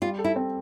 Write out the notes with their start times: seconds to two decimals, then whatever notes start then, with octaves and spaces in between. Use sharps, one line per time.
0.02 G3 F4
0.19 A4
0.24 E4
0.36 C4